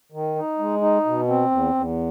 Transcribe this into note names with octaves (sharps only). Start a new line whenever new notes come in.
D#3
D#4
G#3
D#4
B2
C4
E2
E2